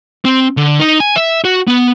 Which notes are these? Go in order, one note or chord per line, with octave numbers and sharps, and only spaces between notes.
C4
D3
D#4
G#5
E5
F#4
B3